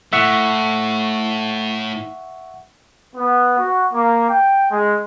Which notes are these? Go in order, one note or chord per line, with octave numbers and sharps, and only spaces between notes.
A2 E5 F#5 C#6
B3
F#4
A#3
G5
G#3